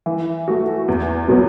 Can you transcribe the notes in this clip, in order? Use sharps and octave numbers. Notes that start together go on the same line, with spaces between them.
E3
A3 F#4
E2
B2 F#3 B3